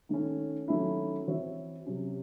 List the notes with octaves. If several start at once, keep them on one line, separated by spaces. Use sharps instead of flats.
D#3 A3 C#4
D#3 F#3 A3 C#4 E4
E3 C4 F#4 C#5 E5
C3 F#3 C#4